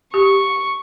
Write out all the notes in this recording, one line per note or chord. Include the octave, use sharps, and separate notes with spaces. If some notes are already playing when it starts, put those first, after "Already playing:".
G4 C#6